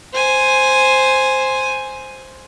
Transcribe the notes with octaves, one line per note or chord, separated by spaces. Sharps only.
C5 G#5